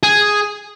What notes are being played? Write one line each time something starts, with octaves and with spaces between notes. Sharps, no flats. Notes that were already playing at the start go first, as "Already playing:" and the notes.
G#4